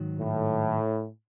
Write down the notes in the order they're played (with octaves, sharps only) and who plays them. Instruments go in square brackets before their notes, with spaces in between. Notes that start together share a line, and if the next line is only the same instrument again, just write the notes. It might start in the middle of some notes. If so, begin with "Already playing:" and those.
Already playing: [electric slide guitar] G#2 D#3 F#3
[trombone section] A2